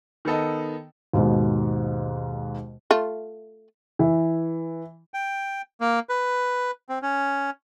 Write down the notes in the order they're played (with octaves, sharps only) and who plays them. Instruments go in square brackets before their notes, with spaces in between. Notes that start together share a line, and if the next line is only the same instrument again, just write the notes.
[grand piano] D#3 B3 A4 D#5
[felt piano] D#2 G#2 B2
[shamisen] A3 F4
[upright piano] E3
[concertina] G5
A#3
B4
C4
C#4